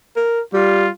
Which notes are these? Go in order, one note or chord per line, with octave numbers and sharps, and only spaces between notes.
A#4
G3 F4